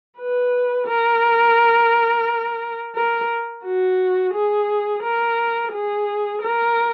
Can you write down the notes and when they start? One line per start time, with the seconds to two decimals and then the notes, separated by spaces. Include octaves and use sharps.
0.18 B4
0.87 A#4
2.95 A#4
3.64 F#4
4.34 G#4
5.03 A#4
5.73 G#4
6.42 A#4